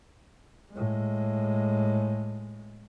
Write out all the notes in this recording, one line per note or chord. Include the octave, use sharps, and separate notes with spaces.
A2 G#3